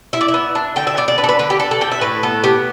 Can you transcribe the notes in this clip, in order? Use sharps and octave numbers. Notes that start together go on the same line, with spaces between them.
E4 E5
D5
E5
B3
D4
D3 G5
E5
B3 D5
D5
D4 B4
A4
B4
D3 B4
G4
D4 A4
A4
D3 G5
E5
A2 B4
B3 A4
B3 G4